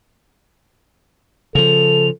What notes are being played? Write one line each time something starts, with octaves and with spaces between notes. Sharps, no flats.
C#3 F3 A4 F7